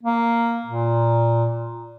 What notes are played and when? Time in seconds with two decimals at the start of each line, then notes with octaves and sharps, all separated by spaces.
0.03 A#3
0.66 A#2